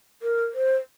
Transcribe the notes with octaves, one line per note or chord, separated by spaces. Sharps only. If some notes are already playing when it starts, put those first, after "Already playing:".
A#4
C5